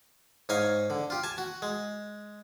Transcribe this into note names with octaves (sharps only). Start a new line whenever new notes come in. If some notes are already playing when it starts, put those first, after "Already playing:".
G#2 D#4 C#5 F5 G#5
D3
F4 G4
G#5 A5
F#4
G#3